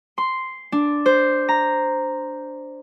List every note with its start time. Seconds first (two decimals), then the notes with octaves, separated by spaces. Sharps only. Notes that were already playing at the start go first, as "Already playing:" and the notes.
0.18 C6
0.72 D4
1.06 C5
1.49 A#5